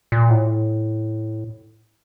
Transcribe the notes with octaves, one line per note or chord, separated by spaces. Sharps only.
A#2
A2